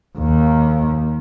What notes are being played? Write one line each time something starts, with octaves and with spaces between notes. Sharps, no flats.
D#2